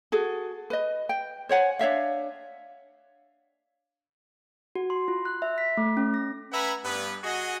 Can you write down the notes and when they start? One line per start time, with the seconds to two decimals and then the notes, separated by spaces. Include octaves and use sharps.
0.12 F#4 G#4 A4
0.70 B4 D#5
1.09 G5
1.49 C5 C#5 F#5 G#5
1.79 D4 C#5 E5 F5
4.75 F#4
4.90 C6
5.08 F4
5.25 F#6
5.42 E5
5.58 B6
5.77 A3
5.97 C#4
6.14 A#6
6.52 B4 E5 F#5 G#5 A#5 B5
6.85 G2 B3 B4
7.23 F#4 G#4 D#5